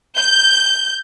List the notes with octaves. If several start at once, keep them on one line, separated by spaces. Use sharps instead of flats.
G6